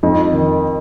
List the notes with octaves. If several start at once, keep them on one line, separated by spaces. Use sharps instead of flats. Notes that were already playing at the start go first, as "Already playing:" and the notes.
F2 D#4
D#3